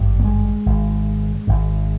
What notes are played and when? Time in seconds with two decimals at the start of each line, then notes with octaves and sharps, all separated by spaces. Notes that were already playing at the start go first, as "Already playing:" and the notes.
Already playing: G#1 G2
0.20 A#3
0.25 G#3
0.66 G#1 G#2
1.47 G#1 G#2